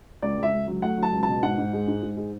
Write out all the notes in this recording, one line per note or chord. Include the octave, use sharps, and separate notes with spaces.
C#2 D5
C#2
E5
C#2
F#3
A3 F#5
F#3 A5
C#2
A5
B2
G#2 F#5
G#2
G#3
G#2
G#2
G#3